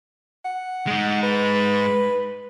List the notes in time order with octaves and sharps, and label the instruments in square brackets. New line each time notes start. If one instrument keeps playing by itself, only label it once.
[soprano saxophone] F#5
[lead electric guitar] G#3 D#4
[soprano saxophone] B4